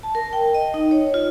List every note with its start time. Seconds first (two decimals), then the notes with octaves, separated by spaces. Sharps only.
0.03 A5
0.15 A#4
0.33 G5
0.54 D#5
0.74 D#4
0.91 C#5
1.14 F4